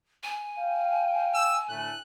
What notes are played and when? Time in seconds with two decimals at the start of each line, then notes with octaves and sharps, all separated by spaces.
0.23 G#5
0.58 F5 G5
1.34 E6
1.69 A2 D3 A3 F#6